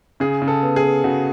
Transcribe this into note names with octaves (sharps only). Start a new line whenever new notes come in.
C#3 G#4
C#3
A4
B3
G#4
B3
C#3 F#4